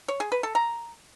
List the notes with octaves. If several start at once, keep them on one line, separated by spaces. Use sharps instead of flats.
C#5
G#4
B4
A4
A#5